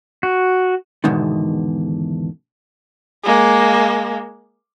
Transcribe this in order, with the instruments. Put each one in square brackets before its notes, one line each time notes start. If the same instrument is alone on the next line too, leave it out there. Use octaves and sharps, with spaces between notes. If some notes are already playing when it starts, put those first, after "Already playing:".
[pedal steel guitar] F#4
[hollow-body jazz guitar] E2 G#2 B2 D3 D#3
[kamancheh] G#3 A#3